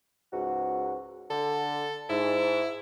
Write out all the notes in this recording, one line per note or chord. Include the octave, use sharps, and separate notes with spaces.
C#2 G#2 F#4
D3 A4
G#2 E4